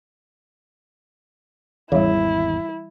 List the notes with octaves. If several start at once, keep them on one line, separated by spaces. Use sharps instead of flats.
G#1 E2 C#3 E3 G3 E4